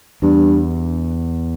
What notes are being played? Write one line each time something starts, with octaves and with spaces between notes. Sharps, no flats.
E2 G2